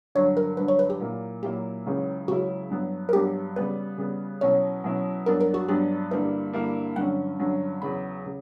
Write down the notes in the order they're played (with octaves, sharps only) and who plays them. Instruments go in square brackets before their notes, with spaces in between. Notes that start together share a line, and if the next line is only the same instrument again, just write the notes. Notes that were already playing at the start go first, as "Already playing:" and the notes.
[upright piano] G2 D3 F#3 [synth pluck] C#5
[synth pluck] A#4
[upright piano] G2 D3 F#3 [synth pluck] B4
[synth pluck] C#5
B4
G4
[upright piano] A#2 F#3 A#3 E4
[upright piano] A#2 F#3 A#3 E4 [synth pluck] G4
[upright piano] C#2 C#3 F#3 C#4 E4
[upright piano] C#2 C#3 F#3 C#4 E4 [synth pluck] F#4
[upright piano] G2 F#3 B3
[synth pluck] A#4
[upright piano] G2 F#3 B3 [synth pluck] G4
[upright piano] C#3 G3 B3 [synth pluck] B4
[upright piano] C#3 G3 B3
[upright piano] B2 F#3 C#4 E4 [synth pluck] C#5
[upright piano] B2 F#3 C#4 E4
[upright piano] G2 F#3 B3 D4 [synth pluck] A#4
[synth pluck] A#4
F#4
[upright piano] G2 F#3 B3 D4 [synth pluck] G4
[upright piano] G2 D3 G3 A#3 E4 [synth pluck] B4
[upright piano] G2 D3 G3 A#3 E4
[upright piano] G2 D3 F#3 C#4 [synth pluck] F#5
[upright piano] G2 D3 F#3 C#4
[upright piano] E2 C#3 F#3 [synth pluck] B5
[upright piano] C#3